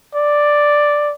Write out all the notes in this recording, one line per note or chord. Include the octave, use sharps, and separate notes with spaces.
D5